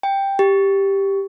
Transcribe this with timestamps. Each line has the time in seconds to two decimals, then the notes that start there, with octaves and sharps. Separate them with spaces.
0.03 G5
0.39 G4